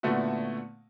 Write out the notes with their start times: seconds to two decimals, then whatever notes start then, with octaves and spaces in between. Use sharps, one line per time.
0.03 A#2 D3 A3 B3 E4 F#4